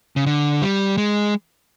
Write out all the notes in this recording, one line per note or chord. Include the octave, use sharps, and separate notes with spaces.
C#3
D3
G3
G#3